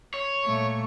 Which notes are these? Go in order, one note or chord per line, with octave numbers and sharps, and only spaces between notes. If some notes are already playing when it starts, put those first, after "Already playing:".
C#5
A#2 A3 C#6